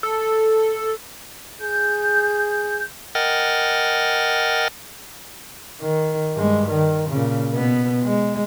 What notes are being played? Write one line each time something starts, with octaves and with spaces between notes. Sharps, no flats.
A4
G#4 G6
A#4 D#5 F#5 G5 F6 A6
D#3
G2 G#3
D#3
A#2 C#3
B2 B3
G#3